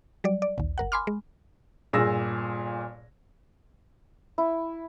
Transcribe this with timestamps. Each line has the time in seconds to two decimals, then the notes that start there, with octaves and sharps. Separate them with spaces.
0.24 F#3 G3 D5
0.42 D5
0.58 A#1 D#2
0.78 G1 A#4 F#5
0.92 G#5 B5 C6 D6 F6
1.07 G#3
1.93 G1 A#2 G#4 E6 A#6
4.38 E4